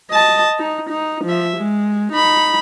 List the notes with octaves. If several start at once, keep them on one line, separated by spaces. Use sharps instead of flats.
D#5 A5
D#4
D#4
F3 E5
G#3
D#4 B5